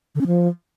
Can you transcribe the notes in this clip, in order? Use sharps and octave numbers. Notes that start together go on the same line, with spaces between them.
D3
C#4
F3